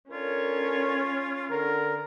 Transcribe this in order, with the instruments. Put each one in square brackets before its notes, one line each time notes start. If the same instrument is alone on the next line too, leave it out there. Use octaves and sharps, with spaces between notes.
[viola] C#4 C#5 [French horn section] D4 A4 A#4 [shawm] F4
[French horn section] D3 [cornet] A#4